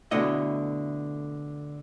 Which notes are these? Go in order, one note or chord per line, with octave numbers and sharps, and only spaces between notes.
B2 D3 A3 E4 D#5